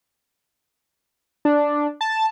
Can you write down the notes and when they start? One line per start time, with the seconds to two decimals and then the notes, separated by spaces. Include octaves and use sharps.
1.45 D4
2.01 A5